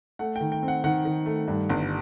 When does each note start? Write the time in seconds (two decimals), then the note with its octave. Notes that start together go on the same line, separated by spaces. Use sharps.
0.19 A3 F#5
0.36 D#3 G5
0.52 G5
0.63 C4
0.68 F#5
0.84 D#3 F#5
1.05 D#3
1.26 A3
1.48 G2
1.69 G1